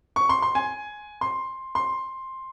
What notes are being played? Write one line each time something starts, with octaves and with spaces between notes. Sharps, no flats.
C#6
C6
C6
G#5
C6
C6